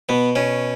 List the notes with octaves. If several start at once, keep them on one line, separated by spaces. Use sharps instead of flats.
B2 B3
B2 C#4